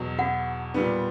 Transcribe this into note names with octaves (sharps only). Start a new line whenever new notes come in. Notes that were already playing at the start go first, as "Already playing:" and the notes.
Already playing: E2 B2 F#3
F#4 F#5
A#2 G3 B3